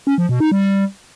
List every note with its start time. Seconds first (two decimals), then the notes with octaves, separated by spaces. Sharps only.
0.07 C#4
0.18 F3
0.29 B2
0.40 D#4
0.51 G3